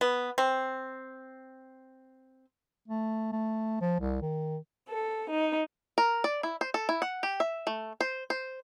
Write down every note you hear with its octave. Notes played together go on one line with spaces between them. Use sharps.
B3
C4
A3
A3
F3
C2
D#3
A4
D#4
A#4
D5
E4
C5
A4
E4
F#5
G4
E5
A3
C5
C5